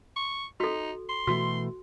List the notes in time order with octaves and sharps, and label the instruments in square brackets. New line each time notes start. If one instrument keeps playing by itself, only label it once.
[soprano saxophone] C#6
[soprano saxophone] D#4 [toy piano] F#4 A4
[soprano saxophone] C6
[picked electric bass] B2 E3 A3 [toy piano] F#4